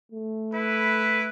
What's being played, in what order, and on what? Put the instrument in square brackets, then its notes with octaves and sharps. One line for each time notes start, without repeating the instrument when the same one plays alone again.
[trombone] A3
[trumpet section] E4 B4